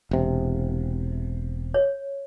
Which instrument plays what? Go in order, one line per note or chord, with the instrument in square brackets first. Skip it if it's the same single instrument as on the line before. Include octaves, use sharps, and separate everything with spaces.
[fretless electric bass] E1 C3
[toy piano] C#5